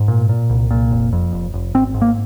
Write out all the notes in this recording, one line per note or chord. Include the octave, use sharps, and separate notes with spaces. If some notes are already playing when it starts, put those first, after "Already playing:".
Already playing: G#2
A#2
A#2
C2
A#2
F1
F2
F1
F1
G#1 C4
G#2
A#3